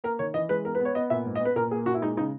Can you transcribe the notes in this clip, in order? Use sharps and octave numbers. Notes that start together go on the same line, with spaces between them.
A#3 A#4
D#3 C#5
E3 D#5
G#3 B4
B3 A#4
B4
B3
C#5
B3 D#5
A#2 E5
G#2
D#5
B3 B4
A#2 A#4
A#3 G#4
A#2 F#4
E4
G#3 D#4
C#3 D#4